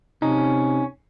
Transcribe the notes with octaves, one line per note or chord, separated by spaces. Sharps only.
C3 C#4 D#4